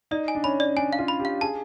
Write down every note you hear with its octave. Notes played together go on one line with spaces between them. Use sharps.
D#4 D5
G#5
D4
C#4 B5
D5
D4 G#5
F5
F4
B5
G4
F5
G#4 A5